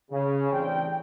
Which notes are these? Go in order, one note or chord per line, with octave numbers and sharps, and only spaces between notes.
C#3
A1 E3 G3 C4 D4 G5